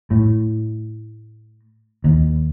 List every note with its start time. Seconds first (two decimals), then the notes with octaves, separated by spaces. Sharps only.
0.11 A2
2.04 D#2